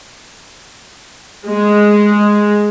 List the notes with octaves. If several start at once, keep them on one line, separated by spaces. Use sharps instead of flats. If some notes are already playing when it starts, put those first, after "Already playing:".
G#3